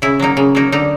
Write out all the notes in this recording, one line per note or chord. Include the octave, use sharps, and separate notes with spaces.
C#3 E4
F#3 A#3 D#4
C#3
F#3 A#3 D#4
D3 D#4